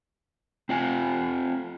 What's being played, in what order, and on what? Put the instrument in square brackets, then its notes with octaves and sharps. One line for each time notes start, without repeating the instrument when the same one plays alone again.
[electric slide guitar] C4 F4 G#5